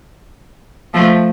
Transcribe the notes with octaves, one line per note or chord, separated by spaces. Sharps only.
F3 A3